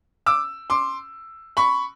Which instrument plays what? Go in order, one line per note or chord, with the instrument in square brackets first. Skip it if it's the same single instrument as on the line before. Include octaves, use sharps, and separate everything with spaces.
[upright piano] D6 E6
C6 D6
B5 C#6